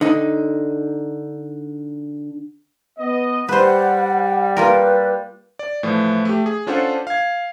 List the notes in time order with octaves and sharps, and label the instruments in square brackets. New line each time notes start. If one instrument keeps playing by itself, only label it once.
[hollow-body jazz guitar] D3 D#4
[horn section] B3 D#5
[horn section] G3 [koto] B4 C5 [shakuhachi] F#5
[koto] A#3 F4 A#4 [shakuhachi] B4
[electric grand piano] D5
A2 E3 F3 A3
A3 G4
G#4
C#4 D4 F4 A4 C5 F#5
F5 G#6